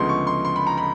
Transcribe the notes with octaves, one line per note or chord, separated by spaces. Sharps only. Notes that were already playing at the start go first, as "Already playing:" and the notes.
Already playing: D2 C#3 F3 G#3 B3 C6
C#6
C6
C6
B5
A#5
B5